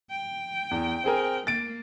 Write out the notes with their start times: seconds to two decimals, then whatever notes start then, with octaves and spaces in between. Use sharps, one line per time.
0.11 G5
0.71 E2
1.04 C4 G#4 A#4
1.47 A#3 A6 D7